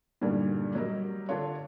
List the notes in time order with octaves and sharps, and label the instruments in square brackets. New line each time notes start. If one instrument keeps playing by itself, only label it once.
[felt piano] G2 A#2 D3 D#3 F#3 G3
F#3 G3 A#4 D#5
D3 D4 F4 C#5